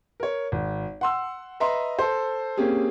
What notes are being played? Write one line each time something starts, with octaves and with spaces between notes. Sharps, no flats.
A#4 C#5
G#1
F#5 C6 E6
B4 D#5 E5 A#5 C6
A4 C5
A#3 C4 C#4 G4 G#4